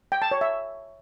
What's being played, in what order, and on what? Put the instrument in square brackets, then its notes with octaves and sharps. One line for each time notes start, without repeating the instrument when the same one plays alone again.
[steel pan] G5
A5
C#5
E5